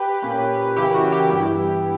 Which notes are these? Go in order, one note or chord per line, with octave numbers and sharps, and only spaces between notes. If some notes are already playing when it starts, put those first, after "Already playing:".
Already playing: G4 B4
A#2 A#3 C#4
C#3 E3 A#3 C#4 E4 G4
F#4
E4 G4
G2 E3 G3 B3 E4 G4